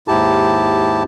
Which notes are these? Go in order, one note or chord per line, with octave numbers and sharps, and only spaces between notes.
D#2 G#2 E4 G4 A5